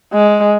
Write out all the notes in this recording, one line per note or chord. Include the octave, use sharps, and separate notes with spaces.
G#3